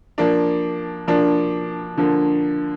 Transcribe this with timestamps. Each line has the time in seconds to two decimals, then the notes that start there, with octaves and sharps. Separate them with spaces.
0.18 F3 A#3 D4
1.08 F3 A#3 D4
1.97 D3 F3 A#3